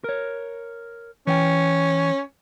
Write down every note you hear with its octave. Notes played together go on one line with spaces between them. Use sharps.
A#4 C#5
E3 C#4 G5